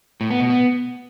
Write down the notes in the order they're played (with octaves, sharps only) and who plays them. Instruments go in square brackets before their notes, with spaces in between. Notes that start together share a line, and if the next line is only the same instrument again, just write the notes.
[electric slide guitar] A2
B3
B2
B3